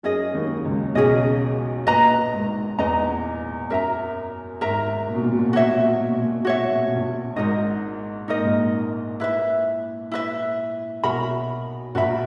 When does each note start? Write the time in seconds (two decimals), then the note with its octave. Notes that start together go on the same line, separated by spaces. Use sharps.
0.03 F#2 F#3 C#4 G#4 D#5
0.34 D#2 D#3
0.65 C#2 C#3
0.95 B1 B2 C#4 G#4 D#5
1.87 A#1 A#2 B4 D#5 A#5
2.32 G#1 G#2
2.79 E2 B4 D#5 A#5
3.70 F#2 A#4 E5 A#5
4.61 G#1 G#2 A#4 E5 A#5
5.08 A#2
5.15 B2
5.24 A#2
5.32 B2
5.39 A#2
5.46 B2
5.53 A#2 F#4 C#5 E5
5.63 B2
5.70 A#2
5.78 B2
5.86 A#2
5.93 B2
6.01 A#2
6.09 B2
6.17 A#2
6.26 B2
6.32 A#2
6.41 B2
6.45 A#2 F#4 C#5 E5
6.57 B2
6.64 A#2
6.72 B2
6.80 A#2
6.88 B2
6.95 A#1 A#2
7.36 G#1 G#2 D#4 A#4 D#5
8.28 A#2 D#4 A#4 D#5
8.38 G#2
8.45 A#1 A#2
9.20 E4 B4 E5
10.12 E4 B4 E5
11.03 B1 B2 F#4 A#4 E5 B5
11.95 A#1 A#2 F#4 A#4 E5 B5